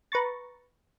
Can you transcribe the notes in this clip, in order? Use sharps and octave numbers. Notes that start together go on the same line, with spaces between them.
B4 A#5 C#6 A6